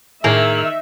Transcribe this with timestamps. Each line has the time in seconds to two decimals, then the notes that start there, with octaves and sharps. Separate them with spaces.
0.24 A2 D#3 A#3 G#4 E5